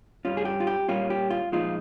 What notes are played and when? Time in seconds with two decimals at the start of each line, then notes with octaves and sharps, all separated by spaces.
0.25 G2 G3 C#4 F4
0.37 G#4
0.45 G4
0.60 F4
0.67 G4
0.89 A#2 G3 A#3 C#4 F4
1.10 G4
1.30 F4
1.52 A#2 F3 G#3 D#4 F4